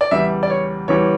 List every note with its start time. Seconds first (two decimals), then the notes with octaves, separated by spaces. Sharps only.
0.01 D5
0.11 E2 C#3 G3 E5
0.43 D5
0.50 C#5
0.88 E2 C#3 E3 G3 C#5